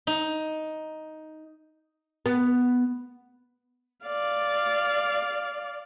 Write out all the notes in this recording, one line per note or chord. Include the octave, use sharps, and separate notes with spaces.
D#4
B3
D5 F5